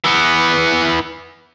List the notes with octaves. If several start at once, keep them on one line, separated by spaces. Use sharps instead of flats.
E3 B3